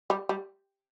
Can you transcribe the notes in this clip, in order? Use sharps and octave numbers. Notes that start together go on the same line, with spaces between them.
G3
G3